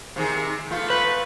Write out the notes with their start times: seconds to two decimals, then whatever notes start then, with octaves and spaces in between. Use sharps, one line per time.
0.16 C3 D#3 G#4
0.70 A3 B3 F4
0.90 B4